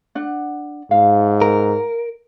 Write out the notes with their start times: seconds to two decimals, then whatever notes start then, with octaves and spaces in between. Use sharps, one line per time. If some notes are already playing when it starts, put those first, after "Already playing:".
0.15 D4 F#5
0.91 G#2 F5
1.42 A#4